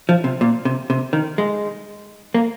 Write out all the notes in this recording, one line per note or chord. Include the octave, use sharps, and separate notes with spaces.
F3
C3
A#2
C3
C3
D#3
G#3
A#3